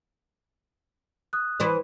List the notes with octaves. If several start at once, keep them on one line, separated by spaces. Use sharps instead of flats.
D#6 F#6
E3 B4 C5